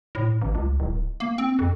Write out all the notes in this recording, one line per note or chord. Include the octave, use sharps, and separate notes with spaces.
A2
A1
C#2
D1
A#3
C4
F2